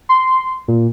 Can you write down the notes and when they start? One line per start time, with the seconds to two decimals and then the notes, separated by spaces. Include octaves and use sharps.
0.09 C6
0.68 A#2